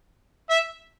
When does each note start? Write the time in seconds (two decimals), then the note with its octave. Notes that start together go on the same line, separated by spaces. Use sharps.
0.50 E5